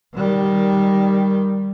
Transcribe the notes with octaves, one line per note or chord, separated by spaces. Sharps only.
D#3 G3